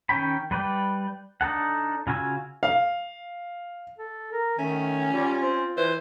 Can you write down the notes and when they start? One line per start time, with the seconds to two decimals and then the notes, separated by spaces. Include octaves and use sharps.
0.09 D#3 C#4 C#5 G5 B5
0.51 G3 B4 D5 G5
1.41 D4 D#4 A4 F#5
2.07 C#3 F4 F#4 G#5 E6
2.63 F5
3.98 A4
4.32 A#4
4.59 D#3 A3 C#4
5.12 G3 F4
5.42 C4
5.77 E3 C5